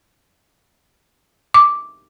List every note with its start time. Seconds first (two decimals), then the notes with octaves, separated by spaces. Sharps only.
1.54 D6